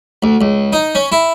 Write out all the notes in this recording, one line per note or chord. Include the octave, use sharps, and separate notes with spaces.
D2
C#2
D#4
C#4
E4